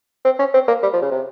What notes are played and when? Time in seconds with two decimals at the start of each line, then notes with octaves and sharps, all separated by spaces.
0.25 C4
0.39 C#4
0.54 C4
0.68 A#3
0.83 G3
0.93 F3
1.02 C#3
1.12 C3